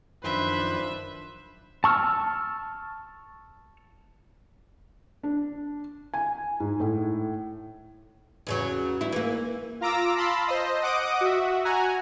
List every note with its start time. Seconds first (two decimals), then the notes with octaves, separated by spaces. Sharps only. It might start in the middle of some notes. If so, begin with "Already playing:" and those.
0.24 F#2 D#3 F3 D4 B4 C5 E5
1.84 A5 C#6 E6 F6
5.23 D4
6.14 G#5
6.60 G#2
6.80 A2
8.47 E2 C#3 F#3
9.01 G3 E4
9.12 E3 A#3
9.81 F4 A#5 D6 E6 A#6
10.17 F5 A5 B5 C6 E6
10.48 C5 D#5
10.81 D#5 F#5 D6 D#6
11.21 F#4 E5
11.65 F#4 F#5 G#5 A#5